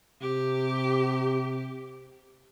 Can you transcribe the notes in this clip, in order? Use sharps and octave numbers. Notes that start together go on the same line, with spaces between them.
C3 G4